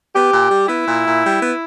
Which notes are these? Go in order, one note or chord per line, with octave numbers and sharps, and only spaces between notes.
B3 G4
A#2
G3
B3 E4
A#2
A#2
G3
B3